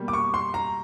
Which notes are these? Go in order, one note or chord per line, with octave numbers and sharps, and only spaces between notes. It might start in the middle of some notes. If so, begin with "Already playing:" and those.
Already playing: B2 G3 A#3
D6
C#6
C6
A#5